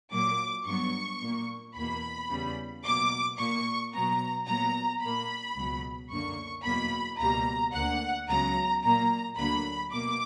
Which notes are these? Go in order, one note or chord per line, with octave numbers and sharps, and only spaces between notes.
A#2 F#3 A#3 D6
G2 F#3 B3 C#6
A#2 A#3
E2 B2 A#3 B5
E2 C#3 G3 B3
B2 F#3 A#3 D6
A#2 A#3 C#6
B2 F#3 B3 A#5
A#2 F#3 B3 A#5
A#2 A#3 B5
C#2 B2 F#3
F#2 D3 A#3 C#6
E2 B2 F#3 A#3 B5
C#2 B2 G3 A#3 A#5
D2 D3 A#3 F#5
C#2 C#3 F#3 B3 A#5
A#2 F#3 A#3 A#5
D2 D3 F#3 A#3 B5
B2 A#3 D6